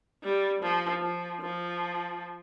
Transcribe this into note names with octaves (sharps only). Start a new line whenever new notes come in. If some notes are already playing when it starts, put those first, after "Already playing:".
G3
F3
F3
F3